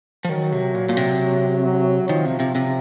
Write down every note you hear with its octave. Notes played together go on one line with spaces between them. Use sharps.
F3
D#3 F#3
C3
A#2
A#2
C3
F#3
D#3 F3
C3
C3
C3